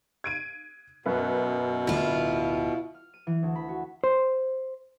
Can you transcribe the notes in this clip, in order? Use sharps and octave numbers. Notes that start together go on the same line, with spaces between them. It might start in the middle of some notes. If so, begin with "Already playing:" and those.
G#6 D7 D#7
F#2 B2 B4
D1 D2 D3 E4 F4
F6
D#7
E3
D2
B5
F#4
C5